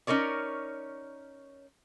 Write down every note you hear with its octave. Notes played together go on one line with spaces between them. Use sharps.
C#4 D#4 A#4 C#5 D5